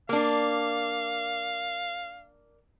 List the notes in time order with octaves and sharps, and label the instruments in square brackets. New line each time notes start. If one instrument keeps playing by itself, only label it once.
[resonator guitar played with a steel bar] A#3 D4 [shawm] F5